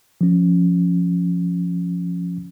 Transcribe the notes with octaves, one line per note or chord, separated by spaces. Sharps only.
F3 C#4